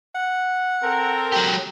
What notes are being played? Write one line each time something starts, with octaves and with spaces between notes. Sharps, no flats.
F#5
C4 A4 A#4
F#3 G4